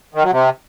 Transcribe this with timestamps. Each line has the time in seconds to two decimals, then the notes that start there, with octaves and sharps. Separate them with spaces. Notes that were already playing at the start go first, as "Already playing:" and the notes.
0.15 D#3
0.23 F#3
0.32 C3